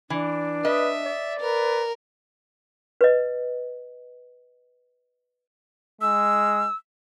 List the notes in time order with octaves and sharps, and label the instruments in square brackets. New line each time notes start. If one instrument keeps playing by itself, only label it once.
[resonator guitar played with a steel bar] E3 [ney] D4
[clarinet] B4 [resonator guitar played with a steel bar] D#5 [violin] E5
[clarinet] D5
[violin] A#4 [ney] B4
[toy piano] B4 D#5
[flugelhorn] G#3 [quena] E6